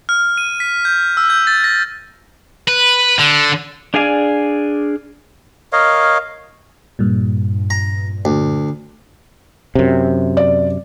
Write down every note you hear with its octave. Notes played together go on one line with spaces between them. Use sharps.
F6
D#7
B6
G6
E6
G6
A6
A#6
B4
D3
D4 G#4 D5 F5 G#5
A#4 C#5 D#5 F5
G2 A#2
A#5
D2
F#2 C3
D5